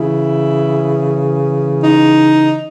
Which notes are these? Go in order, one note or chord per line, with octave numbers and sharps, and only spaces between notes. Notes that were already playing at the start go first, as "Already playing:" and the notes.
Already playing: C#3 E3 E4
D#4